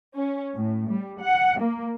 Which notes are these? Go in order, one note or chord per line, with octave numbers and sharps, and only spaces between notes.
C#4
A2
G3
F#5
A#3